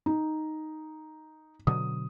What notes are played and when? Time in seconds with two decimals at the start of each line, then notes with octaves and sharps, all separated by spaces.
0.06 D#4
1.67 B2 D3 F#3 D#6